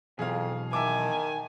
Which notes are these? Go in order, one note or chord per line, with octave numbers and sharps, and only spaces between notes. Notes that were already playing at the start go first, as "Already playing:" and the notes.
F2 B2 E3 F#3 G#4 F5
D#3 E5 G#5 A5 D6